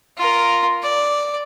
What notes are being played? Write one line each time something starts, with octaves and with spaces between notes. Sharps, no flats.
F4 A#4
D5